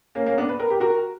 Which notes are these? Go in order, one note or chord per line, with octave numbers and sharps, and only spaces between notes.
A#3 C#4
A#3 C#4
B3 D4
B4
A#4
G4
F#4 A#4